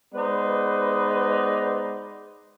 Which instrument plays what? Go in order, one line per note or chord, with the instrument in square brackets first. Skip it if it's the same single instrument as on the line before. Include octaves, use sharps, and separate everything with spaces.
[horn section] G#3 B3 D#4 B4 C5 D5